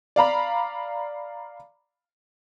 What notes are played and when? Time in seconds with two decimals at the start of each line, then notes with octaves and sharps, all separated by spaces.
0.16 D5 F5 A#5 B5